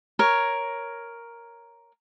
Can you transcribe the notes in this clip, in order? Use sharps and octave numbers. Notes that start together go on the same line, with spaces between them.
A#4 C#5